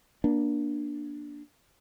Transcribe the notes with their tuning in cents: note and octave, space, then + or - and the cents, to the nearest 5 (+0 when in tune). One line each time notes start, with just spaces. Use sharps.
A#3 +25 D4 +0